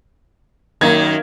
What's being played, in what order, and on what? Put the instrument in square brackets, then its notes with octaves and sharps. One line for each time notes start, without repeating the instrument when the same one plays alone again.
[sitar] F#2 D#3 [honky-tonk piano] A#3 G#6